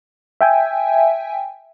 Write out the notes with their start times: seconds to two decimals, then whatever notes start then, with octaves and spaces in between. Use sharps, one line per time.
0.41 E5 G5 G#5